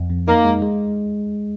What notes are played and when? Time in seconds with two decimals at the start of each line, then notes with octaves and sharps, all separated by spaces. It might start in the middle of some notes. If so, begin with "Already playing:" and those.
Already playing: F2
0.10 F2
0.27 A#3 D#4
0.45 G#3
0.62 G#3